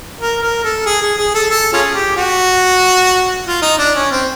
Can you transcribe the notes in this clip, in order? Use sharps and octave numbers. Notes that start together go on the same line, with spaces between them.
A#4
A#4
A4
G#4
G#4
G#4
A4
A4
C#4 F4 G#4
G4
F#4
F4
D#4
D4
C#4
C4